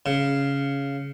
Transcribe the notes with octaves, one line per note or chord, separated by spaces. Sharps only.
C#3